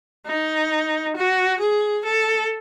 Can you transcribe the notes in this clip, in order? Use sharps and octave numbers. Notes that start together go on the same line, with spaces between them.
D#4
F#4
G#4
A4